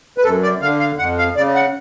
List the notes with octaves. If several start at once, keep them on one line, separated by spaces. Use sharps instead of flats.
B4
F#2 A4
D5
D3 F5
F5
F2 F#5
F5
C#3 D5
F#5